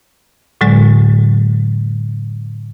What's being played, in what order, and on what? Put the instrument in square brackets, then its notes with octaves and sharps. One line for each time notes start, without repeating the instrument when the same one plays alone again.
[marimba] A2 D3 F#3 G#3